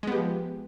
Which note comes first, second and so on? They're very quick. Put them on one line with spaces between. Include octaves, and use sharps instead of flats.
G#3 B3 G4 F3